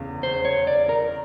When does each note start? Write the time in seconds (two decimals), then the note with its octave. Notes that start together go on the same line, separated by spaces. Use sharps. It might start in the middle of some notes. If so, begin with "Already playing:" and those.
Already playing: F1 E2 C#3
0.23 C5
0.45 C#5
0.67 D5
0.89 A#4